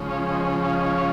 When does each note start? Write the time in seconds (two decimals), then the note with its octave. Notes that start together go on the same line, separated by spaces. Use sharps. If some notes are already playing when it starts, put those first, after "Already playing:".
Already playing: C#3 F3 G#3 C#4
0.10 C#5 F5
0.31 C5 D#5
0.64 F5
0.75 D#5
0.86 C#5 F5